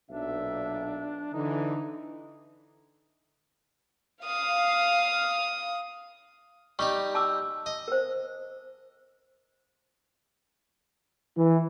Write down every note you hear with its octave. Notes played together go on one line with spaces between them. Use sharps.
B1 A#2 D4 E5
D3 E3 D#4
F5 D#6
G3 D#4 G4 C#6
A5 D6 E6
D#5
A#4 C5
E3